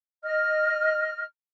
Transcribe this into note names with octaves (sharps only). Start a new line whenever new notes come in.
D#5 F6